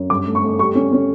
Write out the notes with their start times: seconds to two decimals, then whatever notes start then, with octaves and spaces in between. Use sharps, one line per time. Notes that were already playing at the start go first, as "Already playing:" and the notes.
Already playing: F#2
0.10 G2 D6
0.26 A3
0.35 C#6
0.43 A3
0.59 G3 C#6
0.75 C#4
0.93 C#4